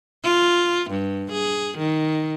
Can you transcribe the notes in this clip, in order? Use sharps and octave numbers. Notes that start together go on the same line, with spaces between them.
F4
G2
G#4
D#3